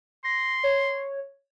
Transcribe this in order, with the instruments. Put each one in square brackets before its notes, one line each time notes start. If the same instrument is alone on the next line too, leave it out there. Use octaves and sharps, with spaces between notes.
[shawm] C6 [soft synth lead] A#6
[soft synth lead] C#5